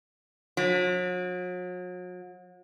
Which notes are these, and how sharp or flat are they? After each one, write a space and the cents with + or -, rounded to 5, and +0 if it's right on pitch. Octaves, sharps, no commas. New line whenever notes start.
F#3 -40